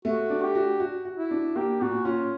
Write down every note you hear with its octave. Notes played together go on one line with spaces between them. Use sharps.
A3 F#4
D4
G4
F#4
F#4
F#4
E4
D4
A#3 G4
A#2 F#4
C#4 F4